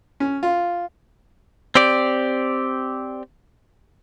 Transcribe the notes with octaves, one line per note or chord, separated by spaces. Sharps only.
C#4
F4
C4 G4 D5